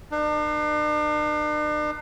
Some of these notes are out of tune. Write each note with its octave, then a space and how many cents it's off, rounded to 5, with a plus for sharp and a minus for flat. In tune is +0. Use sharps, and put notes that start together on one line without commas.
D4 +45 B4 -45